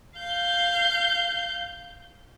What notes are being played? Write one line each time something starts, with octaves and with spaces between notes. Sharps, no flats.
F5 G6